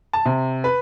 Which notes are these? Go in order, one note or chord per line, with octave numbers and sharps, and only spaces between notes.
A5
C3
B4